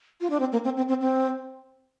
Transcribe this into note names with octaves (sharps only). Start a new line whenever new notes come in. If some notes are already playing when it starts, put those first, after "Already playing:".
F4
D4
C4
A#3
C4
C4
C4
C4